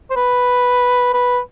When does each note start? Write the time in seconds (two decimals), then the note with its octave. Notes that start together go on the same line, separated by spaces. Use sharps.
0.10 C5
0.16 B4
1.14 B4